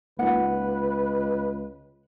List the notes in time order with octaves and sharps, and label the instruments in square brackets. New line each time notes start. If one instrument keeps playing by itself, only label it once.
[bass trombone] C#2 [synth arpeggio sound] A#3 D#4 F4 [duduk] B4 [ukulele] F#5